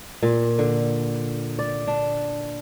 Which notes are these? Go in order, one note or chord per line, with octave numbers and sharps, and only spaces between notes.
A#2
D3
D5
D4